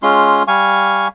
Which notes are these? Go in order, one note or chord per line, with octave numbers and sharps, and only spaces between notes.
G#3 C#4 F4 C6
G3 F5 G#5 C#6